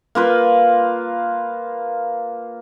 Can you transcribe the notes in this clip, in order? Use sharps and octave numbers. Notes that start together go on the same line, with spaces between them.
A#3 F4 B4